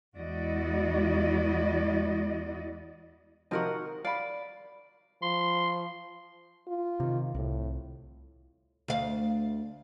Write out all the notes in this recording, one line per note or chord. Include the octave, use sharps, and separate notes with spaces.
E2 G#3 E4 F#4 D5 D#5
C3 D#3 F3 F#4 A#4 D#5
D#3
D5 F5 B5
F3 C6
F4
C3 D#3
C2 A2
D2 F5